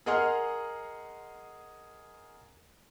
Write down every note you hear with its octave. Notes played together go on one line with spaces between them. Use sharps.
G#4 A#4 D#5 F#5 C6 F6